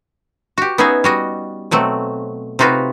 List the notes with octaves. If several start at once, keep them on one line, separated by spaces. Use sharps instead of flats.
F#4 G4
B3 C#4 D#4 F#4 G#4 E5
G3 F#4 D#5
B2 F#3 A3 C4
C3 D#4 F4 F#4 B4